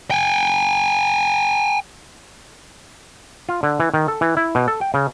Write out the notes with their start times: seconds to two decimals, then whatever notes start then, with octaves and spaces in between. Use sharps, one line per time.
0.11 G5 G#5
3.49 F4
3.63 D3
3.80 E3
3.94 D#3
4.08 A4
4.21 E3
4.37 E4
4.55 B2
4.68 A4
4.81 G5
4.94 C#3